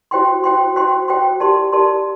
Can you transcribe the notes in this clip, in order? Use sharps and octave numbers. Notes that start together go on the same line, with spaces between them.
F#4 C5 G5 C6
F#4 C5 G5 C6
F#4 C5 G5 C6
F#4 C5 G5 C6
G4 A#4 D5 A5 C6
G4 A#4 D5 A5 C6